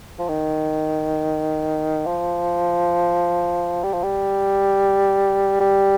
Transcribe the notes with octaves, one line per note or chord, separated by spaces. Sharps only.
F3
D#3
F3
G3
F3
G3
G3